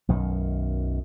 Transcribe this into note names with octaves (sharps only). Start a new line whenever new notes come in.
B1 F#2 D#3